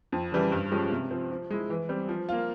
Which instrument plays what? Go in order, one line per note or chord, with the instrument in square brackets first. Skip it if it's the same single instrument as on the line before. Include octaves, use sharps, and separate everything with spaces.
[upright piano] F2
C#3 E3 G3
G2
F3 G#3 C#4 G4
C3
F3 C4
F3
G#3 E4
E3
G3 C4
F3
A#3 F4